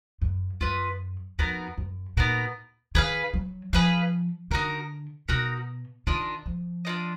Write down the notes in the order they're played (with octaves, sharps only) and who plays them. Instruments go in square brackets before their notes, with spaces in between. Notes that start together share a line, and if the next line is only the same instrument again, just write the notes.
[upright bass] F#2
[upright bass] F#2 [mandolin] F4 B4 D#5
[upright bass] F2 [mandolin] B3 D#4 F#4 A#4
[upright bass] F#2
[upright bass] A#2 [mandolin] B3 D#4 F#4 A#4
[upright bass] D#3 [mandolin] G#4 B4 F5
[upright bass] F#3
[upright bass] F3 [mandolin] G#4 B4 F5
[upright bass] D3 [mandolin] D#4 F#4 A#4
[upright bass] B2 [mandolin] D#4 F#4 A#4
[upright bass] D#3 [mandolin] D4 F4 A#4 D#5
[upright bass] F3
[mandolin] D4 F4 A#4 D#5